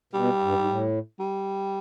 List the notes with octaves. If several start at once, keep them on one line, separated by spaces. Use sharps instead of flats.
B2 G3
G2
G#2
A2
G3